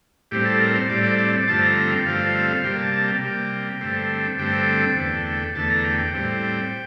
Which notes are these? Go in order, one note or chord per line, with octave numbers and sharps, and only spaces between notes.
A2 G3 C4 G4
A4
A#4
C5
A2 G3 C4 D5
D5
D5
G2 D3 F3 A3 C4 A5
A#5
A#5
G5
G2 D3 F3 A3 C4 F5
F5
C3 G3 A#3 G5
A5
A5
G5
C3 G3 A#3
G2 D3 A3 C4
G2 D3 A3 C4 G5
E2 D3 A3
E2 D3 A3 A5
A#5
G5
G5
A2 G3 C4